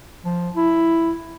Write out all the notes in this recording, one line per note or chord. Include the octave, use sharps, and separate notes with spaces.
F3
E4